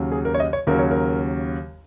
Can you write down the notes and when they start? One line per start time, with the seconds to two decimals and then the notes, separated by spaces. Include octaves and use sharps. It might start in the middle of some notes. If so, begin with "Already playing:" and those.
Already playing: D#2 C#3 F#3
0.12 G#4
0.25 A#4
0.34 C#5
0.40 D#5
0.53 C#5
0.67 D#2 C#3 F#3 A#4
0.79 C#5
0.91 A#4